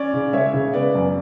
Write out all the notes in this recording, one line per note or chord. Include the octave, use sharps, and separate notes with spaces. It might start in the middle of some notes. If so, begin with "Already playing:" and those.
Already playing: C#4 D5
C#3
G#3 C#5 E5
C#3
B3 D5
F#2